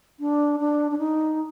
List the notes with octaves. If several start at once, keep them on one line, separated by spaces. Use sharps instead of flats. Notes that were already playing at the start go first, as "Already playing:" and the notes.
D4
D4
D4
D#4